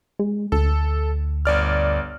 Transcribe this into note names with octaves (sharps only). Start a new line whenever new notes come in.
G#3
D2 A4
G1 D5 F6